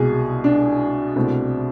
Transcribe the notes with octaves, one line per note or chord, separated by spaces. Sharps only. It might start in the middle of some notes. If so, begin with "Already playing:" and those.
Already playing: C2 B2 G#3 G#4
D4
C2 B2 A3 C4